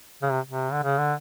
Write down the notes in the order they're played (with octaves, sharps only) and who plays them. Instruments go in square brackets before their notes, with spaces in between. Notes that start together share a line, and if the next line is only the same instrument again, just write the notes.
[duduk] C#3
C3
C3
D3
C#3
D3